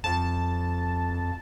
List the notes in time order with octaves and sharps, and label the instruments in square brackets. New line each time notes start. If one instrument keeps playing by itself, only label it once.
[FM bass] F2 [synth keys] A5